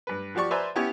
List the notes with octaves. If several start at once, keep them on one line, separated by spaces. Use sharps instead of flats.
G2 B4
F3 F#4 G4 D5 C#6
B4 C5 D5 E5 G#5 A#5
B3 C#4 E4 G4 C#5